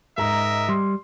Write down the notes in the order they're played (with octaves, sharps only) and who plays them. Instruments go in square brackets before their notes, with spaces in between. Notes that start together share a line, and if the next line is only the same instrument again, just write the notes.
[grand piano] G#2 A#5 [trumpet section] A#4 D#5 E5
[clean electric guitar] G3 [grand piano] C6